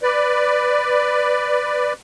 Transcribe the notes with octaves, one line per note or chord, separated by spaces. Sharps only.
B4 D5